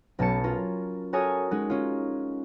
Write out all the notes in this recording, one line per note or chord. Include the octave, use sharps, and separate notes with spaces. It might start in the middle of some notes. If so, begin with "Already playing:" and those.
B1 B2 C#4 A5 C#7
C#4 F4 A#4
F#4 A4 A#4 C#5 G#5 D#6
G#3 C#4 D#4 F#4
C#4 F4